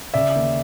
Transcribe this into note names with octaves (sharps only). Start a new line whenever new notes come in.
C#3 D5 E5
D#2